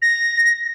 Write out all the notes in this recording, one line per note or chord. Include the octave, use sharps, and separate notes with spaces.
A#6